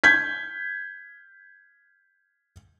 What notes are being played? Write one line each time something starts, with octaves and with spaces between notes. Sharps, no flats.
G6 G#6 B6